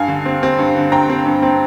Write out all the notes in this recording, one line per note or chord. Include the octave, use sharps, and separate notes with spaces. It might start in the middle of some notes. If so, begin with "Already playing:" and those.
Already playing: G2 F5 G#5
D3
C4
C4
G2
D3
C4 G5 A#5
C4
G2
C4